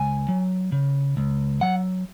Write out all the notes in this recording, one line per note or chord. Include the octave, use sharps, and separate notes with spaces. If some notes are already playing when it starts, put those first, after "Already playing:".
Already playing: C#2 G#5
F#3
C#3
C#2
F#3 F#5